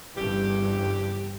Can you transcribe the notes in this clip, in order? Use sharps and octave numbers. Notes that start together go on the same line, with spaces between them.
G1 G2 C#3 E3 G4